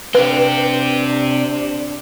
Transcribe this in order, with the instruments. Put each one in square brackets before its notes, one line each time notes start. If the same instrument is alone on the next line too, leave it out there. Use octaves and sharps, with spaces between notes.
[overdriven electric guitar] C4 G4 [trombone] D4 [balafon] B4